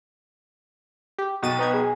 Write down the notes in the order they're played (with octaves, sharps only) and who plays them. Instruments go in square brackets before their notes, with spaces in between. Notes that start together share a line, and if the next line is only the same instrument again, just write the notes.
[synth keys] G4
[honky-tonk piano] B1 F#4 G5 [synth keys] D#4 A6 D#7
[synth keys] B3 D#4 G#6 [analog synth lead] B4
[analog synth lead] G#4